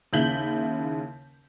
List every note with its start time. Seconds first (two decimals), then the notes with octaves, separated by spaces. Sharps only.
0.13 D#2 C#3 E4 G6 B6 F#7